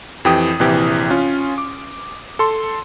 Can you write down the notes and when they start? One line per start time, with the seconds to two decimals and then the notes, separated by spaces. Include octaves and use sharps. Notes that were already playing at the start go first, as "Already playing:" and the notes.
0.25 F2 E3 G4 G5 D#6
0.60 A#1 C3 E3 G4
1.10 C#4 F4
1.58 D6
2.39 A4 C6